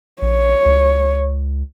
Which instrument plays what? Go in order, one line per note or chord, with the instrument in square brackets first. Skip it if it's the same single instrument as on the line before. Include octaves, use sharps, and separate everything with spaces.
[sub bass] A#1 [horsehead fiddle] C#5
[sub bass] C#2